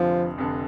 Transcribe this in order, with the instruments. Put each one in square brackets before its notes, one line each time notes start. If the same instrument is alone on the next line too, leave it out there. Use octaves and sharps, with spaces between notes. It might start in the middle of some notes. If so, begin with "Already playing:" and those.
Already playing: [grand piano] F1 F2 D3 [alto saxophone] F3
[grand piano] F1 F2 D3